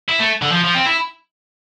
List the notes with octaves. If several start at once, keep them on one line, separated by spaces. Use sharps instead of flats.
E4
A3
D3
F3
F3
C4
E4